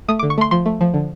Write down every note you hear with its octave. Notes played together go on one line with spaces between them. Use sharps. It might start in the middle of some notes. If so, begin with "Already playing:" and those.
A3 D#6
D6
D3
C#6
A3 C6
F3 C6
A3
F3
D3